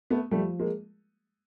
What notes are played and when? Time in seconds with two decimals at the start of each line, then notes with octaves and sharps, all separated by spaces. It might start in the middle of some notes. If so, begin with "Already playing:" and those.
0.10 A3 B3
0.31 F3 G3 A3
0.59 G#3 A#3